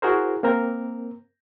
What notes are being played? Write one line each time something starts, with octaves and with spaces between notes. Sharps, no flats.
E4 F#4 G#4 A#4 C5
A#3 C4 A#4